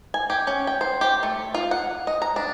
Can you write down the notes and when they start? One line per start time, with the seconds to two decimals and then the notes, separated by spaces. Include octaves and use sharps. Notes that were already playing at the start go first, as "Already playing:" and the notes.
0.14 G#5
0.30 G4
0.47 C#4
0.67 G5
0.81 C5
1.01 G4
1.23 A3
1.54 F4
1.71 F#5
2.07 D#5
2.22 A#5
2.36 D4